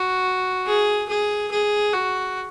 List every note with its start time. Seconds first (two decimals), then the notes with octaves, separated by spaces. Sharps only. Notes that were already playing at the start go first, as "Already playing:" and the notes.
Already playing: F#4
0.67 G#4
1.09 G#4
1.51 G#4
1.94 F#4